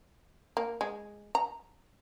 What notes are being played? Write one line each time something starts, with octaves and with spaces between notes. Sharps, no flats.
A#3
G#3
A#5